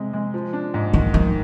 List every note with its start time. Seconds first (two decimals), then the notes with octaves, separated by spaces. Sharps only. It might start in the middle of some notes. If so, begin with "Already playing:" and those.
Already playing: C3 G#3
0.13 G#3
0.34 F3
0.53 D4
0.74 G#2
0.93 D#3 E3
1.13 D#3 F3